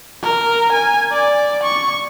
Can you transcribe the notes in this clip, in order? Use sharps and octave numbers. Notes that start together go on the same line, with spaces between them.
A#4
G#5
D5
C#6